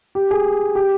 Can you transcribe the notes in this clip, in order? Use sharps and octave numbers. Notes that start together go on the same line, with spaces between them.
G4
G#4
G4